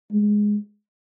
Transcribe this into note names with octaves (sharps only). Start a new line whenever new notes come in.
G#3